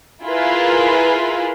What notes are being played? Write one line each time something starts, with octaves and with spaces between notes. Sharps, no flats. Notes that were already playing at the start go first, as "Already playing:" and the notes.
E4 F4 G#4 A#4 B4